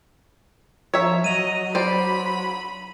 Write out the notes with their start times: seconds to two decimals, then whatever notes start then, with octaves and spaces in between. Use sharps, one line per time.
0.94 F3 C#5 E5 A#5
1.24 F#3 D#5 D#7 F7
1.75 C5 D5 B5